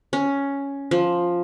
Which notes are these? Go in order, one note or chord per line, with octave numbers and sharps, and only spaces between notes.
C#4
F3